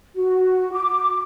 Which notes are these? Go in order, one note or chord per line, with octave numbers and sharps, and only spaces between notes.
F#4
D6